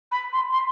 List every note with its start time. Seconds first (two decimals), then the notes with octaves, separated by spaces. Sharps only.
0.12 B5
0.33 C6
0.52 C6